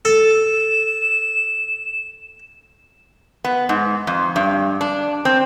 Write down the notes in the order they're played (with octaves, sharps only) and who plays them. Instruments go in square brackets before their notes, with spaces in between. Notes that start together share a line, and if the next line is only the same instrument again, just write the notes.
[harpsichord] A4 [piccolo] E7
[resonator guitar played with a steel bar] B3
G#2
F2
G2
D4
C4